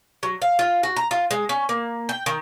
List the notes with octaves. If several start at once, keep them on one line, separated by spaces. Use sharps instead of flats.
F#3
F5
F4
F#4
A#5
F4
G#3
C#4
A#3
G5
D#3